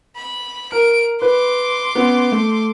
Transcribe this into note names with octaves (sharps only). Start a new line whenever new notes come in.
B5
A#4 D7
B4 C6 D6
B3 C#4
A3